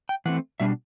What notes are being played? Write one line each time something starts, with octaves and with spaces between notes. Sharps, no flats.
G5
E3 A3 C4 F#5
B2 G3 D4 E5